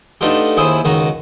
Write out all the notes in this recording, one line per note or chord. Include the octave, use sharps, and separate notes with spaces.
A3 B3 D4 D#4 F4 G4
D#2 E4 G#4 C5 B5 D#6
C#2 D#3 D#4 F#4 A#5